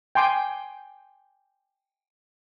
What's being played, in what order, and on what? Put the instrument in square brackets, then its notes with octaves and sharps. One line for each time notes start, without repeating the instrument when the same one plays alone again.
[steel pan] G5 G#5 C6 D6